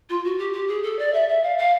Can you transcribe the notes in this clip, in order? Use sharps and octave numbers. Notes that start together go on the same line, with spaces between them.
F4
F#4
G4
G4
G#4
A4
D5
E5
E5
F5
F5